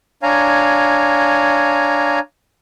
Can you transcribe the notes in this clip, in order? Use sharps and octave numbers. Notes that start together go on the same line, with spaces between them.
D4 C#5 F5 G#5 A#5